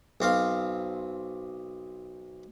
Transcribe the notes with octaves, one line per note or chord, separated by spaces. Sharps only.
B1 C4 F5